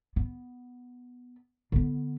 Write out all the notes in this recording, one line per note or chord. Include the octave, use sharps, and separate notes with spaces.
B3
D3 B3